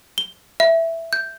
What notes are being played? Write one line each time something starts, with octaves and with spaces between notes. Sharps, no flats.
G7
E5
G6